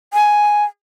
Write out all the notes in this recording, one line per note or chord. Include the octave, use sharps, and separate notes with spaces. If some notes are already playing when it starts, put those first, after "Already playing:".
G#5